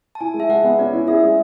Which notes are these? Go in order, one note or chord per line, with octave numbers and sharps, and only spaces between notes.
A5
E4 G#5
G#3
E5
G#3 F#5
B3
C#4 D5
E4
G#4 E5
G#3